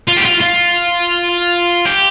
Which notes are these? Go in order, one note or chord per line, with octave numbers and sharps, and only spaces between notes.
F4
G4
F4
F4
G4